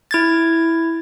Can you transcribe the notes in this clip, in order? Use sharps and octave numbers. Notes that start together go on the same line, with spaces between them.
E4 G#6 A6